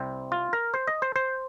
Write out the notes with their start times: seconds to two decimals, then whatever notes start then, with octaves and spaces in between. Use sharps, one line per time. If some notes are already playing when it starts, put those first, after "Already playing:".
Already playing: C2 C3 G3 C4
0.32 F4
0.53 A#4
0.74 C5
0.87 D#5
1.02 C5
1.16 C5